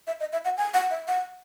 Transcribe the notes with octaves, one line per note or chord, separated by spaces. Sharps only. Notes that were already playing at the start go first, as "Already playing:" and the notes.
E5
D#5
E5
F#5
G#5
F#5
E5
F#5